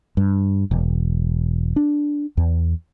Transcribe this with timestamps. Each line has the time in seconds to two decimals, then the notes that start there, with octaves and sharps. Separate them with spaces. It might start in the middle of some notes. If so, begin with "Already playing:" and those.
0.17 G2
0.71 E1
1.76 D4
2.37 E2